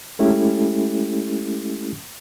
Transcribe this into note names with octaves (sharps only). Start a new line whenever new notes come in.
G#3 A3 C#4 E4 G4 A4